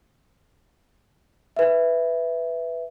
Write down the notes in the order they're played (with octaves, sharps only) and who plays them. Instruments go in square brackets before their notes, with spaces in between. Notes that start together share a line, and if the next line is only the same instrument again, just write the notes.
[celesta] B4 E5